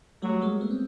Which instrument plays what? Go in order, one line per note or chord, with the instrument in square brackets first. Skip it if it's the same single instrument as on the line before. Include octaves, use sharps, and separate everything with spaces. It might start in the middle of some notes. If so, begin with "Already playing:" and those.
[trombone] F#3 [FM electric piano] G3 A3
[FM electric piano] G#3 A#3
A3 B3
C4